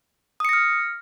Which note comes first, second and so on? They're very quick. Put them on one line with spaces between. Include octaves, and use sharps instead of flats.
D#6 C#7 A#6 F6